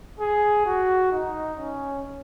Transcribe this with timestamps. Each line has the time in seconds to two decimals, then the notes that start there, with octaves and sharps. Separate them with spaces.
0.19 G#4
0.66 F#4
1.12 D#4
1.59 C#4